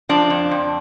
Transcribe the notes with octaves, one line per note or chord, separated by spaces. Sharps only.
F3 D4
F2
F2